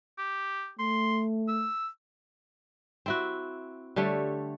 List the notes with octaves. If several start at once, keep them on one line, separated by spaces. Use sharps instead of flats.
G4
A3 C6
E6
C4 E4 F#4
D3 G3 A3 C#5